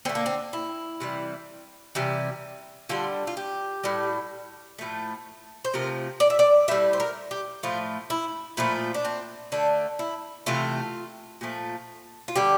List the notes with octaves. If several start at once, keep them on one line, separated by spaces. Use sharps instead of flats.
D3 A3 C4
A#3
C4
E4
C3 E3 G3
C3 E3 G3
D3 G3 F4
F4
G4
A2 G3
A2 F3 A3
C5
C3 F3 A3 A#4
D5
E5
D5
A2 G3 E5
C5
A#4
G4
A2 F3 A3 F4
E4
A#2 F3 A3 E4
D4
C4
D3 A3 D4
E4
C3 E3 A3 F4
A#2 F3 A3
F4
D3 G3 G4